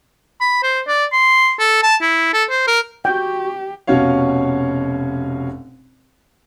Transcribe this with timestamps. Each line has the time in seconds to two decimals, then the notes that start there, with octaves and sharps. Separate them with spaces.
0.41 B5
0.63 C5
0.88 D5
1.13 C6
1.60 A4
1.83 A5
2.02 E4
2.34 A4
2.50 C5
2.67 A#4
3.05 F#4 G4 G5
3.87 F1 B2 C#4 F#4 C#5 F5